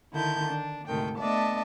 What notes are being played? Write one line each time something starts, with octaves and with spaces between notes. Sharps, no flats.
D3 D#3 E4 A5 G6
D4
D2 G#2 C3 D#3 A4 G5
A3 B3 D4 D#5 E5 A5